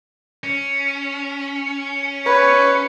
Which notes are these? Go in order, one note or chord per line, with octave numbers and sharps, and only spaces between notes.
C#4
B4 C#5